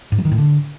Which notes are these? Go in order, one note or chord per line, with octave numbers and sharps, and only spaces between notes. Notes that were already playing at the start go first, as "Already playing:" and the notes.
G#2
F#3
D#3
A2
D3